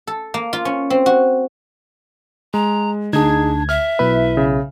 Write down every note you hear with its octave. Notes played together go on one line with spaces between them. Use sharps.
A4
A#3
F4
C#4
C4
F#4
G#3 A#5
D2 D4 D#4 G#4 G#6
E5 F6
B1 B2 E4 B4
C#3